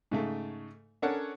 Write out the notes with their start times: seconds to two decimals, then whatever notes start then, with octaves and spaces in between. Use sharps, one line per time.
0.11 G#2 C#3 A3
1.02 C#4 D4 A4 A#4 C#5 F#5